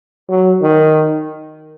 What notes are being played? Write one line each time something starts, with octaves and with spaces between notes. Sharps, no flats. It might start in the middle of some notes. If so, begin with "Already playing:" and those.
F#3
D#3